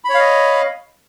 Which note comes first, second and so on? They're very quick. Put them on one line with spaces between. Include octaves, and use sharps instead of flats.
B5 C#5 F5 D#5